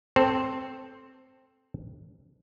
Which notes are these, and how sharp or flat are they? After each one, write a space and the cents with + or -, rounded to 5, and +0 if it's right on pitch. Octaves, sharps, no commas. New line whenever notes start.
C4 +0 A4 +5 C5 +10